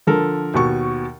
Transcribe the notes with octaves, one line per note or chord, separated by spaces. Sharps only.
D3 F3 A4 A#4
D#2 B2 C#6